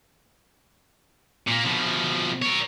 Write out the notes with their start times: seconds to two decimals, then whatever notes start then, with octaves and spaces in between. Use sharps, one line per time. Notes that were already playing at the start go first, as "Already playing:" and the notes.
1.47 A#2 A#3
1.65 B2 F3
2.42 A#4 C#5